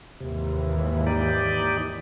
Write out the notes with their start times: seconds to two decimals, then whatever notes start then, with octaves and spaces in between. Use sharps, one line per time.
0.20 D#2 G#2 C3 E3
1.06 D#4 G4 D5